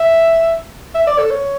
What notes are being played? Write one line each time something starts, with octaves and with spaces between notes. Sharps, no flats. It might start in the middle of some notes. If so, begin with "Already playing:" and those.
Already playing: E5
E5
D5
A4
C#5